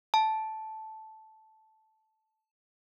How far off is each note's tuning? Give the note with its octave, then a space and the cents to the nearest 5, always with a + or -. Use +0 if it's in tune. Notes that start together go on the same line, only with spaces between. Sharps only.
A5 -10